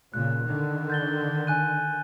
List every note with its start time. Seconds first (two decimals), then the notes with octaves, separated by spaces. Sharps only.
0.14 A#2 C#3 F#6
0.45 D3 D#3
0.90 G6 A6 G7
1.47 G#5 F#6 D#7